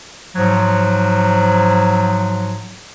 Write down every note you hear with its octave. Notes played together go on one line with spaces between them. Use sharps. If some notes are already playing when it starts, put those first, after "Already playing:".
G#2 F3 F#3